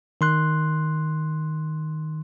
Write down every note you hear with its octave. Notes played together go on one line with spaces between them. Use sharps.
D#3 C6 F#6